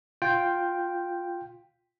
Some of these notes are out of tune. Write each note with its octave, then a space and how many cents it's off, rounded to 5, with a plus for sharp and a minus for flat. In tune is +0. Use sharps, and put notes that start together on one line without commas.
F4 +5 G5 +0